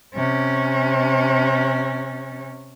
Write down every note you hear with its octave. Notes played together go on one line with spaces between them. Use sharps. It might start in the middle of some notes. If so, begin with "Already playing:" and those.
C3 C#4